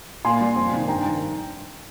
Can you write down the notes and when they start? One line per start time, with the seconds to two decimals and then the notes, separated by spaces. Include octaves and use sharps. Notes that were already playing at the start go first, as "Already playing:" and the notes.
0.25 A#2 G#5 C6
0.41 G3
0.56 F2
0.73 C3 D#3
0.88 G2 G5 A#5
1.05 D#3 G3